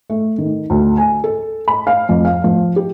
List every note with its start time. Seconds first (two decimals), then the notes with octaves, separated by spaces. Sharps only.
0.10 A3
0.38 D#3
0.70 D2
0.97 G#5
1.24 A4
1.68 B5
1.87 F5
2.09 F2
2.25 F5
2.44 F3
2.76 G4